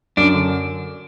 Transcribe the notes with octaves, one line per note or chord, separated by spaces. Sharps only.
F#2 D4
D3